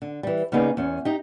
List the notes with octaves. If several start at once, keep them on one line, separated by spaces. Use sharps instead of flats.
D3
E3 G3
C#3 A#3 B3 D#4 G#4 D5
E2 C#4
D#4 G4